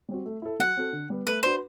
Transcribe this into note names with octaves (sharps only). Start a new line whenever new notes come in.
G3 C4 F#4
A3
E4 A4
F#3 F#5
C4 F#4 A4
D3
G3 B3
A3 B4
D4 F#4 B4 C5